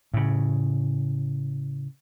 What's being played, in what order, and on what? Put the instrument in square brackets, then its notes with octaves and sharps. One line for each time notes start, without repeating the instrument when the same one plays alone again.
[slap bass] A2 C#3